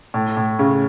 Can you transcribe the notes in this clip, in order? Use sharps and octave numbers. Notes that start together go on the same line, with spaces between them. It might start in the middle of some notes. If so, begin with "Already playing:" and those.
A2
A2
C#3